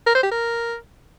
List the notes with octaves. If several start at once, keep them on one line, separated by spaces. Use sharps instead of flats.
A#4
C5
G4
A#4